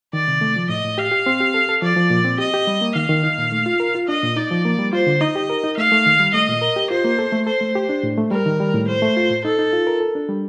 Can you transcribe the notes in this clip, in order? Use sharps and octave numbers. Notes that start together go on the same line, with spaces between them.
D#3 D5
C3
A3
F3
A2 D#5
A2
G4 F5
G4
C4
G4
A4
A4
F3 D5
F3
A#2
C4
G4 D#5
G4
G3
A#3
D#3 F5
D#3
D#4
A#2
A3
F4
A#4
F4
D4 D#5
A#2
D#4 D5
F3
A#3
G3
F4 C5
D3
D#4 D#5
G4
A#4
D#4
A3 F5
A3
D#3
G3
A3 D#5
A#2
A#4
G4
F4 C5
A#3
A4
A3
A4 C5
A3
G4
D4
A2
A3
G3 A#4
D#3
G3
A2
A3 C5
A3
F4
A2
D#4 A4
D#4
F4
A#4
A4
D4
G3